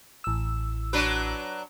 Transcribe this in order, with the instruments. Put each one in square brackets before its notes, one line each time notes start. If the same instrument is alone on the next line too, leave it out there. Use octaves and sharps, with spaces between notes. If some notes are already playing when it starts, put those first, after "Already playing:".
[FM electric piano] A1 E6
[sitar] F#3 D4 B4